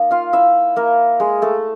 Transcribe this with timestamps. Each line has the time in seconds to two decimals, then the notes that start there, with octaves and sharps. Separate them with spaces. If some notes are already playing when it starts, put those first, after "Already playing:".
Already playing: A#3 D#4
0.11 F4 F5
0.33 E4 E5
0.76 A#3 A#4
1.20 G#3 G#4
1.42 A3 A4